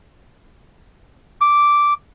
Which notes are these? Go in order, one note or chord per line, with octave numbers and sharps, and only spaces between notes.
D6